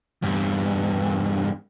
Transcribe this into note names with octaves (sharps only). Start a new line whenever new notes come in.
E2 G2